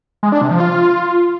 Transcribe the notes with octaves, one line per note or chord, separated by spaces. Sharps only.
G#3
D4
C3
F3
F4